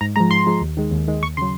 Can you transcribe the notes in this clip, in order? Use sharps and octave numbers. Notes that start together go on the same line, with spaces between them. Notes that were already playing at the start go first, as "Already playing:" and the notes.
G#2 A#5
F3 G#3 A#5
G#2 C6
F3 G#3
D#2
D#3 G#3
D#2
D#3 G#3
D#2 C#6
C#3 F#3 C6